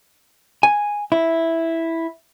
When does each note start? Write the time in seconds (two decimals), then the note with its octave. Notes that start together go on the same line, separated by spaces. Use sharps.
0.63 G#5
1.12 E4